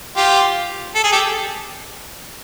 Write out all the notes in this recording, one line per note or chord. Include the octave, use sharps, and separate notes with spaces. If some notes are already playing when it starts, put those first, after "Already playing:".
F4 G4
A4
G#4
G4 A4